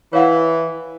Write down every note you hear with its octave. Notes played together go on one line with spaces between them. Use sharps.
E3 C#5 F5 F#5